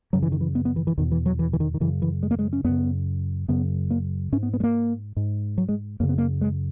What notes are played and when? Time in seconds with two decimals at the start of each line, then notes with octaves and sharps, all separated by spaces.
0.13 F#2 C#3 F#3
0.23 E3
0.32 D#3
0.41 E3
0.55 B3
0.65 B3
0.76 E3
0.87 E3
0.97 E2 B2 D#3
1.12 E3
1.26 F#3
1.39 E3
1.53 E3
1.60 D#3
1.74 D#3
1.80 F#2 C#3 E3
2.02 E3
2.23 G#3
2.31 A#3
2.39 G#3
2.53 C#4
2.64 F#2 C#3 B3
3.48 F#2 C#3 B3
3.90 A#3
4.32 G#2 C#4
4.43 B3
4.54 B3
4.60 G#3
4.64 A#3
5.17 G#2
5.58 F#3
5.69 G#3
6.00 F#2 C#3 A#3
6.09 B3
6.18 A#3
6.41 G#3